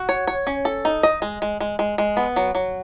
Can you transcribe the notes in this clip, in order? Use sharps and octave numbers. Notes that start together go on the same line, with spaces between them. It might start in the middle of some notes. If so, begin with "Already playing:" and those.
Already playing: F#4
C#5
C#5
C#4
A4
D#4
D#5
G#3
G#3
G#3
G#3
G#3
B3
F#3
F#3